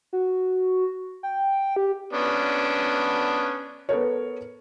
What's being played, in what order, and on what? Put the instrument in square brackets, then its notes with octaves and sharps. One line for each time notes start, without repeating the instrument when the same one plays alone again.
[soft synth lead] F#4
G5
G4
[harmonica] B3 C#4 D4
[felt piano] B3 A4 A#4 C#5